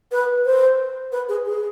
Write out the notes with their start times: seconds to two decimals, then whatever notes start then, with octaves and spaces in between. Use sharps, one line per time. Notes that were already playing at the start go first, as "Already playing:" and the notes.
0.12 B4
0.45 C5
1.12 B4
1.29 G#4
1.46 G#4